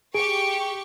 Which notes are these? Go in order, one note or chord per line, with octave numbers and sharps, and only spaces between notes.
G4 G#4 C#6 D7